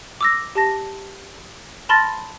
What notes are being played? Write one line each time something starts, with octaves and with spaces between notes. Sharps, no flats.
D6 E6 A#6
G4 A5 A#6
A5 B5 C6 F6 A6 A#6